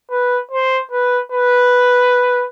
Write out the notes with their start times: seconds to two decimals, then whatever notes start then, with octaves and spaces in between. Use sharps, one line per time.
0.11 B4
0.51 C5
0.92 B4
1.32 B4